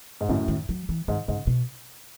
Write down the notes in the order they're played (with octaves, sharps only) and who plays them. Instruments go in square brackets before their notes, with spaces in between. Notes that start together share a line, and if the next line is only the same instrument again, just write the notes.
[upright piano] G#2
[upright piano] F#2 A2 [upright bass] D#3
[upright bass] D#3
F#3
E3
[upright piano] G#2 [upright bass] D#3
[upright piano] G#2 [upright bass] C#3
[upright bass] B2